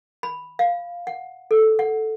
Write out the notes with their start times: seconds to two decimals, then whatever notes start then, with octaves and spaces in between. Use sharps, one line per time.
0.23 B5
0.59 F5
1.07 F#5
1.51 A4
1.79 F#5